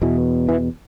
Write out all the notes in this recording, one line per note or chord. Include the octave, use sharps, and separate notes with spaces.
E2 B2 E3
E3